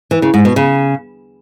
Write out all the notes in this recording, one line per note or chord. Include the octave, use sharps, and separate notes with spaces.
E3
C#3
G#2
B2
C#3